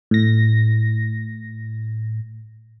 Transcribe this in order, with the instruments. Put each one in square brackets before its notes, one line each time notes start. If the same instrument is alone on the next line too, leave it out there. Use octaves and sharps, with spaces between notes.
[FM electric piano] A2 A#6